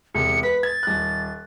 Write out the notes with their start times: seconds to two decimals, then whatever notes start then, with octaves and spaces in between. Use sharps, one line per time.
0.15 E1 C3 C#7
0.43 B4 B6
0.63 G#6 A6
0.83 D#1 F#6